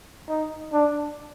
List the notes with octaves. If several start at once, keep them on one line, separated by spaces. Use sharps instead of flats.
D#4
D4